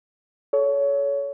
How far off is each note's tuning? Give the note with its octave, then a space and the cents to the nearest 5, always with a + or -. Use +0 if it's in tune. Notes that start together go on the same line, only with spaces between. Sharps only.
A4 -25 C#5 +20